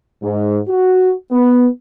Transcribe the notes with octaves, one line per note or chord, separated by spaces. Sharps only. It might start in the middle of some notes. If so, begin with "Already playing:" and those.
G#2
F#4
B3